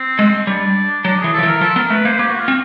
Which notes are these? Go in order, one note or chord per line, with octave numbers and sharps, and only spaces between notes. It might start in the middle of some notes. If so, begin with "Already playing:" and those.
Already playing: C4
G#3
G3 D4
F#3 D4
E3 G#4
A4
F3
E3
A#4
F3 A4
B3 A#4
A3 B4
A#3 C5
A#3 G4
F#4
F4
C4